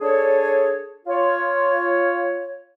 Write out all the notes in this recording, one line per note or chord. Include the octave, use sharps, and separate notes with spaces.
D4 G#4 A4 C#5
F4 C#5